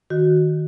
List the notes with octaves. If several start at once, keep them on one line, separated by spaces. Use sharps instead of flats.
D#3 F#4